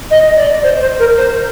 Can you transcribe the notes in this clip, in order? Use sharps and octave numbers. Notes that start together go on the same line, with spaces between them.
D#5
D5
C5
C5
A#4
C5